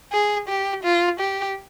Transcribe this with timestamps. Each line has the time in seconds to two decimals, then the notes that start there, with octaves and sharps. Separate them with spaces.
0.12 G#4
0.48 G4
0.84 F4
1.20 G4